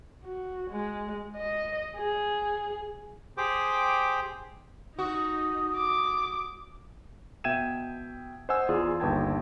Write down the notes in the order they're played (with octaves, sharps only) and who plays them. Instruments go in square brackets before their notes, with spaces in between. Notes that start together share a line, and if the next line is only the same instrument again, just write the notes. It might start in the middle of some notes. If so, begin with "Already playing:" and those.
[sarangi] F#4
G#3
D#5
G#4
[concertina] G4 G#4 C5 G5 D6
[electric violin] D#4 [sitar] F#4 [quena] D#6
[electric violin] D6
[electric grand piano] B2 E5 G5 G#6 D#7 E7
C5 D#5 F#5 G#5 E6
E2 F4 G#4 D5
G1 D#2 B4 G5 A5 G#6